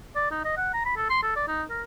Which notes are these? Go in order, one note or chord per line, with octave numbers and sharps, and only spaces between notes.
D5
D#4
D#5
F#5
A#5
B5
A4
C6
A4
D5
D#4
A#4